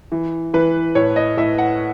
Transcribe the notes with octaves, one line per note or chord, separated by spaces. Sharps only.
E3
E3 B4
A2 C#5
D#5
A2 E5
F#5